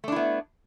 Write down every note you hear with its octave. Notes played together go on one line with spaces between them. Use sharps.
A3 B3 D4 E4